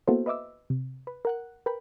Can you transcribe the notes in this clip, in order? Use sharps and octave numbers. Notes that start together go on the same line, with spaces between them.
A#3 B3 E4 F#4 A4 C5
B4 D#5 E5 D6 E6
C3
B4
A#4 F#5 F#6
A#4 B4 G5 B5